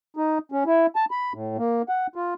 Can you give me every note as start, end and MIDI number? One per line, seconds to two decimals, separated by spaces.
0.17 0.38 63
0.52 0.64 61
0.66 0.86 64
0.96 1.05 81
1.11 1.33 83
1.34 1.57 45
1.58 1.82 58
1.89 2.07 78
2.16 2.34 65